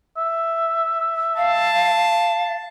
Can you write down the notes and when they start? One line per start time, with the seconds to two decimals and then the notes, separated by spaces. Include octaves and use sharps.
0.17 E5
1.37 F5 A5